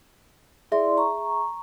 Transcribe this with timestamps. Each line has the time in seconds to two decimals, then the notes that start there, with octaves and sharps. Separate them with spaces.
0.72 E4 G#4 D5 E5 C6
0.97 A#5 C#6